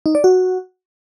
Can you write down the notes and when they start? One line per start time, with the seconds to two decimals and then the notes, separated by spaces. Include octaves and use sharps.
0.06 D#4
0.15 D5
0.24 F#4